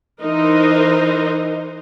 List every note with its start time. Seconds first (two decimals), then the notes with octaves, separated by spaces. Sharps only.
0.22 E3 D#4 A#4 C5 D#5